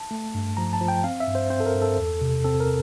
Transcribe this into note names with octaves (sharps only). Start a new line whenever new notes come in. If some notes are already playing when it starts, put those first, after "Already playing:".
Already playing: A5
A3
G2
F3 A#5
A5
F3
G5
C4 F5
E5
G2
C5
C4 C5
A4
A#4
G2
A4
E2
C3
C4 A4
A#4